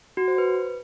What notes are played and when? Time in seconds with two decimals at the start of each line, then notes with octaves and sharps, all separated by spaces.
0.17 F#4
0.28 C5
0.38 B4